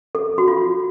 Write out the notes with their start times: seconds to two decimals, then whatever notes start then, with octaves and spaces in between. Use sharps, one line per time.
0.15 A4
0.38 F#4
0.48 F4